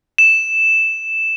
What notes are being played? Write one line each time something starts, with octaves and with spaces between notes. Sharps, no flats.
E7